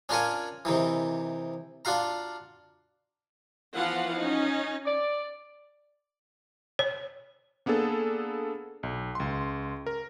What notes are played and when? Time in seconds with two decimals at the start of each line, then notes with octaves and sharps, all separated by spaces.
0.09 C#4 D4 F4 A#4 C#5 G#5
0.65 C3 D#3 E3
1.85 D4 F4 F#4 F5 A#5
3.75 E3 F3 B3 F4 F5 F#5
4.16 C#4 D#4
4.85 D5
6.79 C#5
7.66 A#3 B3 D4 G#4 A4
8.83 B1
9.15 C#2 C6
9.86 A#4